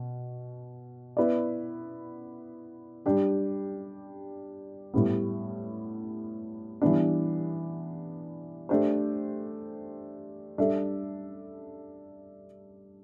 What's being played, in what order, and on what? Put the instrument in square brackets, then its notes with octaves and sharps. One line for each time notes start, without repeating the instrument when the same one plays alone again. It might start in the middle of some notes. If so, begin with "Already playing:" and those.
Already playing: [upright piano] B2
B3 E4 B4 D5
G3 D4 G4
A2 G3 B3
E3 G3 B3 D4
A3 D4 G4 C5
G3 D4 A4 E5